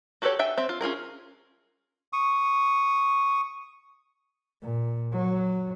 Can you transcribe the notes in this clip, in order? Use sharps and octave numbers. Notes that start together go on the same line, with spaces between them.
F#4 G4 A4 B4 C#5
E5 G5 G#5
C4 E5
F4
C#4 F4 G#4 A#4
C#6 D#6
A#2
F#3